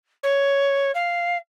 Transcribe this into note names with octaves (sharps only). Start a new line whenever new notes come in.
C#5
F5